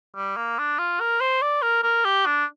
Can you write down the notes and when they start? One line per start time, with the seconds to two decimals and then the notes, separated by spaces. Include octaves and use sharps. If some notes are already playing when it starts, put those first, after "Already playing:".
0.16 G3
0.37 A#3
0.59 D4
0.79 F4
1.01 A#4
1.21 C5
1.42 D5
1.62 A#4
1.84 A#4
2.05 G4
2.26 D4